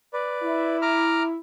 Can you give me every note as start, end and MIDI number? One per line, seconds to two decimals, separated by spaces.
0.13 0.77 71
0.13 0.77 74
0.43 1.36 64
0.82 1.23 82
0.82 1.23 86
0.82 1.23 89